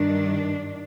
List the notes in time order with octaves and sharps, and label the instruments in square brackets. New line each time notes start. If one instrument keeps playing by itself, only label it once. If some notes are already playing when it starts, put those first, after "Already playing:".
Already playing: [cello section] G2 D#3 D4